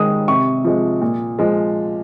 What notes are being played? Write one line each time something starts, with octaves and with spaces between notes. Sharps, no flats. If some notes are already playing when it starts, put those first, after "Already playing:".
Already playing: G#2 D#3 G#3 D#6
C3 C#6
F3 G#3
A#2
F3 G#3